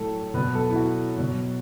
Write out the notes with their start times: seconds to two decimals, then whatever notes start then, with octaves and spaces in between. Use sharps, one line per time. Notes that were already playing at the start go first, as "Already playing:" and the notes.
Already playing: A2 F#3 A4
0.34 B2 F#3 B4
0.55 A4
0.70 E4
0.76 F#4
1.18 B2 F#3